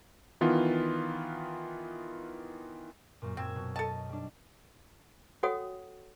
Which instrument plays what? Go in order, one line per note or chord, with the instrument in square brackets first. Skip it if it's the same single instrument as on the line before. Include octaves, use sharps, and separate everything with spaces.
[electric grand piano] D#3 E3 B3 F4
[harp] F#2 A#2
[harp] A#2 E6 G#6 [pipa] C4
[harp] B2
[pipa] A4 A5 [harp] D#5
[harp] G3 D4
[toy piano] F#4 A4 C#5 F#5 G5 D#6